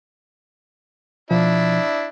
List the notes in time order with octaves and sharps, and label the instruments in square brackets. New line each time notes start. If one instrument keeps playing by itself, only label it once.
[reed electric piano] B2 F3 [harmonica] D4 E4